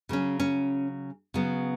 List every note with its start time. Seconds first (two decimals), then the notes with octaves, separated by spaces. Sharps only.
0.09 C#3 F#3 C#4
0.40 C#4
1.34 C#3 F#3 B3